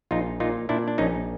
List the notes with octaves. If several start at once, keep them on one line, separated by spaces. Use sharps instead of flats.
A#1 D#4 F4
A#2 D#4 F4
A#2 D4 E4
D4
A#1 C#4 D#4